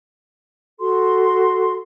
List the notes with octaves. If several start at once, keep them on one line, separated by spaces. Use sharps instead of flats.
F#4 A4 C6